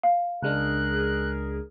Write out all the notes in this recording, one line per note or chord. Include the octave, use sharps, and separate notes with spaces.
F5
C#2 G#3 D4 G#4 A#4 F#6